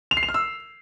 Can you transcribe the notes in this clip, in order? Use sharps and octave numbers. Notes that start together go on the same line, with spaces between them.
F7
C7
F7
F6
E6